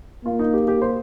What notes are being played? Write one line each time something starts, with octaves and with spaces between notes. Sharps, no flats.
A#3 F4
D#4
G4
G4
C5